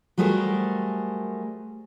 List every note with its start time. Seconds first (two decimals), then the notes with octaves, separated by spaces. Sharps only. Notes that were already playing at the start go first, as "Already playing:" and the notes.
0.18 F#3 G3 A3 G#4 A#4 C5